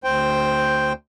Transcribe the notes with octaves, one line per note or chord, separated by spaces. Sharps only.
D2 C5 G5